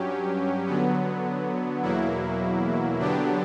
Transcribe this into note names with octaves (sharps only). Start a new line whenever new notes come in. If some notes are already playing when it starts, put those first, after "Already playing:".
Already playing: G2 F#3 C#4 G4
D3 F#3 B3
E2 B2 F#3 A#3 E4
D3 F#3 B3 D4 G4